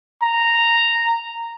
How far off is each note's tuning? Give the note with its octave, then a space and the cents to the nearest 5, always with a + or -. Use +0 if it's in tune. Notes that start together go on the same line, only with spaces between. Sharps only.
A#5 -5